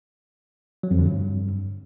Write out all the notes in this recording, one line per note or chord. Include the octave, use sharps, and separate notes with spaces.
F#3
F2
D3
G2